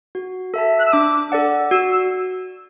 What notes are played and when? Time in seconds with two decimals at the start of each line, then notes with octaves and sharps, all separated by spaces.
0.15 F#4
0.54 A4 E5 A5
0.79 F#6
0.86 E6
0.93 D4 D6
1.32 A4 D5 F#5
1.71 F#4 E6
1.90 E6